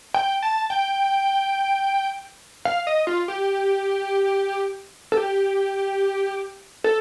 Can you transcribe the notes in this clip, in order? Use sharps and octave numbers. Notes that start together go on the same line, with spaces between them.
G5
A5
G5
F5
D#5
F4
G4
A4
G4
A4